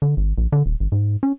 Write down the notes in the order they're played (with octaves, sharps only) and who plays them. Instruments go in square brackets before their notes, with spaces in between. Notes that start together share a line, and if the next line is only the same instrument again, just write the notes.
[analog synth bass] D3
G#1
A#1
D3
D#1
G#1
G#2
C#4